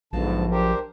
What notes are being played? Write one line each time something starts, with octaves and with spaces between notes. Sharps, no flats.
A#1 G#2 D3 F3 F#3 B3 A5
D4 G4 A#4 C5